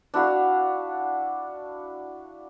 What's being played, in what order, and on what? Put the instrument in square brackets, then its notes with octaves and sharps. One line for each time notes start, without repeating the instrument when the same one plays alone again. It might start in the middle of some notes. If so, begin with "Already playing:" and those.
[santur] D4 E4 F#4 F5